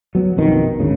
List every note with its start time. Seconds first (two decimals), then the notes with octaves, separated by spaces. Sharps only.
0.15 F#3 B3
0.36 A#1 F2 B2 D#3
0.80 G#1 D2 C#3